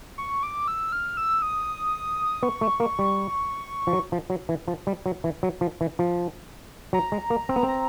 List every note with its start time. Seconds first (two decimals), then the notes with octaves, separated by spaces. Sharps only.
0.18 C#6
0.43 D6
0.68 E6
0.92 F6
1.17 E6
1.42 D#6
2.43 B3 C#6
2.61 A3
2.80 A#3
2.99 G3
3.87 F3
3.93 F#3
4.12 F3
4.30 F#3
4.49 E3
4.68 F3
4.87 G3
5.06 F#3
5.24 E3
5.43 F#3
5.61 F3
5.81 E3
5.99 F3
6.93 F#3 A#5
7.12 G#3
7.30 A#3
7.49 C4
7.56 B3
7.63 C4
7.68 A#5